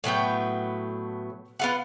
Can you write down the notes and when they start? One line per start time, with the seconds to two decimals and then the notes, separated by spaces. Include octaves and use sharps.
0.04 A2 F#3 B3 G5
1.59 B3 F4 F#5